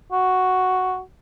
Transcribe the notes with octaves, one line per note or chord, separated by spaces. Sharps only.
F#4